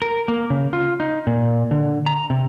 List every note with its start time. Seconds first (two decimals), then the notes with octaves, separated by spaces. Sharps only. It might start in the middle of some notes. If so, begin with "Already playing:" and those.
0.02 A#4
0.28 A#3
0.50 C#3
0.73 F4
1.00 D#4
1.27 A#2
1.71 D3
2.06 A#5
2.30 C3